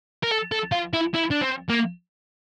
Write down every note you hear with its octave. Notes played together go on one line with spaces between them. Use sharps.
A#4
A4
A4
F4
E4
E4
D4
C4
A#3